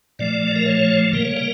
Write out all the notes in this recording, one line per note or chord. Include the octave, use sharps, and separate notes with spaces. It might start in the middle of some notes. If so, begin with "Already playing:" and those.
A#2 F3 A3 D5
A#4
C#5
C#3 G3 A#3 A#4
C#5
A#4